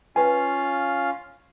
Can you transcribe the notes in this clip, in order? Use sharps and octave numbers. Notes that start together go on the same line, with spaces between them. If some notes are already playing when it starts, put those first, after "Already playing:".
C#4 F4 B4 F5 G#5